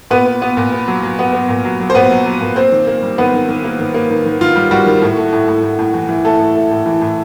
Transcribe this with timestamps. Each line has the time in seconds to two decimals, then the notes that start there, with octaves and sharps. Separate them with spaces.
0.11 A#2 B3 B4
0.26 B3
0.42 B3
0.57 A#2
0.72 B3
0.88 F#3
1.03 F#3
1.19 B3
1.33 B3
1.49 A#2
1.65 F#3
1.80 F#3
1.90 C5
1.95 A#2 B3 B4
2.11 F#3
2.26 F#3
2.41 A#2
2.56 A#3 C4 C5
2.72 D#3
2.87 A#3
3.03 G3
3.18 D#3 B3 B4
3.33 D#3
3.49 D#3
3.64 A#3
3.79 D#3
3.94 A#3
4.10 D#3
4.25 D#3
4.41 D#3 F4
4.56 G3
4.71 G3 F#4
4.86 D#3
5.02 A2
5.17 A3
5.33 A2
5.48 A2
5.63 A2
5.79 A2
5.94 E3
6.09 E3
6.25 A3 A4
6.40 A2
6.55 A3
6.71 A2
6.86 E3
7.01 A2